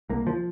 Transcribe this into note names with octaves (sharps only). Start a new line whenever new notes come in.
C2 A#3
F3